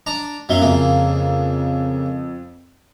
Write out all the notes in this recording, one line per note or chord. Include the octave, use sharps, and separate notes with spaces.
D4 A#5
F#2 F#3 E5 F5 G7
F2 C#3 A#3